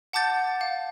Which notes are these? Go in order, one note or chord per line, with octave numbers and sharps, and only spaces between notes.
F#5 A5 D6 G6 A6
F5